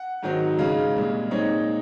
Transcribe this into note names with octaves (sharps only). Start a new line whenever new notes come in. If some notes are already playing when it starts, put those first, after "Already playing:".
Already playing: F#5
G#2 D#3 F#3 C4 D#4
C#3 G#3 D#4 F5
C2 A#2 G#3
A#2 G#3 C4 D#4 C#5